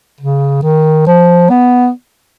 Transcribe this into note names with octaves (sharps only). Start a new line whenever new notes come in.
C#3
D#3
F3
B3